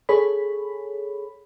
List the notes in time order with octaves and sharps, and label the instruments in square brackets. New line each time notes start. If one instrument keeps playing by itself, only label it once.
[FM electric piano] G#4 A4 C#5 B5